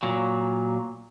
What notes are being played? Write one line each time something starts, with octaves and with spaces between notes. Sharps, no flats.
A#2 F#3